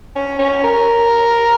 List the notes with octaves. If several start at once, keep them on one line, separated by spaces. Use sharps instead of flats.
C#4
C#4
A#4